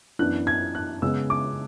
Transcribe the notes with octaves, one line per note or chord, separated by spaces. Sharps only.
F#2 E3 B3 D4 F#6
G#6
F#6
C#3 G#3 B3 E6
D6